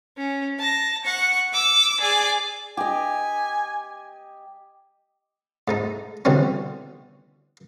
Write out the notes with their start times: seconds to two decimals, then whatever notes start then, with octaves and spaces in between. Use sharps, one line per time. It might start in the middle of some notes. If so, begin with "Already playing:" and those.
0.17 C#4
0.59 A5 A#6
1.04 F#5 C#6
1.53 D6 E6
2.00 G#4 D5
2.77 G4 D#5 G#5
5.68 G#2 A3 D#4
6.25 B2 D3 E3 G3 C4 C#4